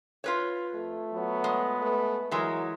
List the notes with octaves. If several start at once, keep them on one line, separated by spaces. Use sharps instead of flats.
F4 B4 C#5
F2 A3
F#3 B3
G#3
A3 B4
E3 F#3 G#3 A#4